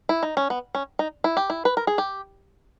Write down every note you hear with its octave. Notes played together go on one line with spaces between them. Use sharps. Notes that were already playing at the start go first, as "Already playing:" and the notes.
E4
D#4
C#4
B3
C#4
D#4
E4
G4
E4
B4
A#4
G#4
G4